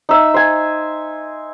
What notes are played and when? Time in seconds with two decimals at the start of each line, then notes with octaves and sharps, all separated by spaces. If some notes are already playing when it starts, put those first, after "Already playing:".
0.09 D#4 E5
0.34 C5 G#5